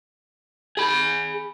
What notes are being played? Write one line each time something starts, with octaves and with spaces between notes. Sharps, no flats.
G#4 B5